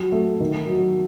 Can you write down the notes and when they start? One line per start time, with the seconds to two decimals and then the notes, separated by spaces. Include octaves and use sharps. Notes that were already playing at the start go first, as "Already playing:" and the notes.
Already playing: F#3
0.12 A3
0.40 D#3
0.67 F#3